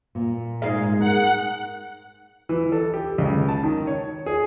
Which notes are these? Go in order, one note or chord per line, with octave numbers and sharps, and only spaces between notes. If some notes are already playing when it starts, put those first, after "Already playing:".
A#2
G#2 G#3 F5
D#4 A#4 F#5
E3
A4
G4
C#2
A5
D#3
C#5
G#4